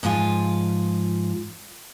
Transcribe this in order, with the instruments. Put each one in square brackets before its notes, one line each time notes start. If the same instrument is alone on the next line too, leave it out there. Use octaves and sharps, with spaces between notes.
[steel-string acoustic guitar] G#2 F3 E4 F4 G#5